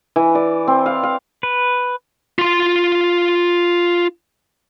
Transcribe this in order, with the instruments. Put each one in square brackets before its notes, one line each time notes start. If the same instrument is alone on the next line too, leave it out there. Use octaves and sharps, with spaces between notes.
[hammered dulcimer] E3
D5
C4
F5
F5
[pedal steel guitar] B4
[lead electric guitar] F4 C6